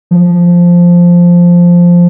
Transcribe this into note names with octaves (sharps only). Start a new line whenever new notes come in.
F3